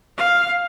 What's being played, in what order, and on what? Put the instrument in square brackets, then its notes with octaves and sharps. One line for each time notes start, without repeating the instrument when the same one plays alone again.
[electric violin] F5